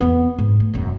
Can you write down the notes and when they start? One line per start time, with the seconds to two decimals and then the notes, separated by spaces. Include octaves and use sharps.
0.01 E2 B3
0.38 G#2
0.60 A3
0.73 E1 F#2